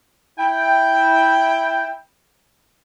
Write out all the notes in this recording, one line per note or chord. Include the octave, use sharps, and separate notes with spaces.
E4 G5